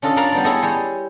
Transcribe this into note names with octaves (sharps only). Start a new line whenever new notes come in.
C#4 D4 F4 A4 D#5
D4 A#4 D5 F5 A#5 B5
G3 B3 D5
E4 G#4 A4 C#5 D#5
G3 C#5 G#5 C6